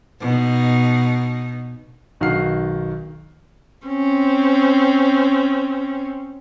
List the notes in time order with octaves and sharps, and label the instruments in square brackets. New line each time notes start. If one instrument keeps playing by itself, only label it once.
[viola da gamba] B2 D#4
[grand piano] B1 D#3 F#4 F5 F6 C7
[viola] C4 C#4